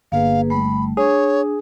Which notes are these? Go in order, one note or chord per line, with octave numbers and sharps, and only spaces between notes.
G1 A#3 G#4 B4 F5
G3 A3 B5
D4 G#4 C#5